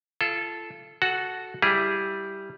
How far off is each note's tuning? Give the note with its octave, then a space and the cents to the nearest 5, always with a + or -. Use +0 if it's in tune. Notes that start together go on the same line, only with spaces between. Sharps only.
F4 -35 A4 -10
F#4 +0 A4 -10 F#5 +0
G3 +0 E4 +0 G#4 -10